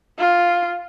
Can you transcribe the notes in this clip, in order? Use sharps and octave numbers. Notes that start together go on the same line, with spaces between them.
F4